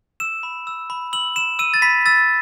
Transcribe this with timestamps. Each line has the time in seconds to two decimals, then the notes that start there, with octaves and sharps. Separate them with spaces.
0.20 E6 E7
0.43 B5
0.67 E6
0.90 B5
1.13 E6 F#7
1.36 B5 E7
1.59 E6 D#7
1.74 A6
1.82 B5 B6
2.06 E6 A6